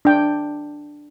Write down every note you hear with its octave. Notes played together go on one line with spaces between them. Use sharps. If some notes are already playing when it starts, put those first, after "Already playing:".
D4 G5